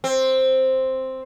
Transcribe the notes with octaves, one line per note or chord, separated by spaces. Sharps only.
C4